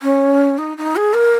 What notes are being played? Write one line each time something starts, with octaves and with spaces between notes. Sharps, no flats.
C#4
D#4
D#4
G#4
A#4